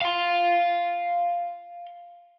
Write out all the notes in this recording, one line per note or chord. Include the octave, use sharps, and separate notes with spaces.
F5 C6